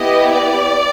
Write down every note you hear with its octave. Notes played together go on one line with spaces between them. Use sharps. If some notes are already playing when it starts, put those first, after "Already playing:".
Already playing: B3 E4 G4 D#5
D5